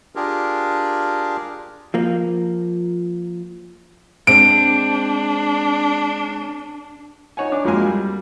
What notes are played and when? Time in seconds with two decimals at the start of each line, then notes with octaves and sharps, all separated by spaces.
0.16 D4 F4 G4 G#4 A#4
1.94 F3 A#3
4.27 G#3 C4 D4 D7
7.37 D#4 C#5 F#5 G#5
7.52 D4 D6
7.64 F2 F#3 G#3 A#3 G#5 C6
7.86 G3